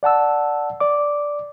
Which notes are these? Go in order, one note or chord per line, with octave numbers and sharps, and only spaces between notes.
D5 F#5 A5 E6
D5 D6